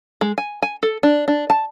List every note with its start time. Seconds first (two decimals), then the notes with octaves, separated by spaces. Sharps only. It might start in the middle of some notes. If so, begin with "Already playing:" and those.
0.21 G#3
0.38 G#5
0.62 G#5
0.83 A4
1.03 D4
1.28 D4
1.50 A5